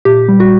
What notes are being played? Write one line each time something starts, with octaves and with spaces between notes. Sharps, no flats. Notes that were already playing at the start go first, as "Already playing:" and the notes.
A#2 G4
G3
F#4